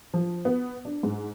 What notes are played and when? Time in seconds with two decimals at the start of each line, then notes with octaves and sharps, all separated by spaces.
0.14 F3
0.45 B3
0.85 D4
1.03 G#2